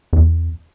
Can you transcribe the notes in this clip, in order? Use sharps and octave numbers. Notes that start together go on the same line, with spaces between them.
E2